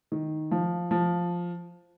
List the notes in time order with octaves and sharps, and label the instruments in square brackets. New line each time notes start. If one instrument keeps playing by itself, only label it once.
[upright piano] D#3
F3
F3